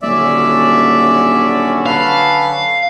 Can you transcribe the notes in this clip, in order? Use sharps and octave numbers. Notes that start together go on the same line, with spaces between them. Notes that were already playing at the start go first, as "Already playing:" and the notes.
D#1 D3 F#3 C#4 D5 E5
A4 B4 F5